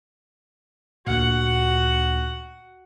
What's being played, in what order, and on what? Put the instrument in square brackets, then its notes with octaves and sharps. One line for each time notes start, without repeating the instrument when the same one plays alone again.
[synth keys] D2 A#2 [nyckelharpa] F#4 F#5